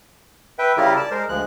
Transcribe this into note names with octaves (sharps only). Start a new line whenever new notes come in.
B4 E5 G5
C#3 G3 E4 F4 G4 A#4
D5 A5
G#3 A#4 C5
D2 F3 G#3 F#6